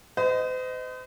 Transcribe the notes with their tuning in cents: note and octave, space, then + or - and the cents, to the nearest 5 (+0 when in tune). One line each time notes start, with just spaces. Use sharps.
C5 -45 D#5 +5